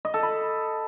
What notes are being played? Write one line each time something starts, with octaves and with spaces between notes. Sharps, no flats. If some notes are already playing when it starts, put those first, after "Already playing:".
D#5
A4
B5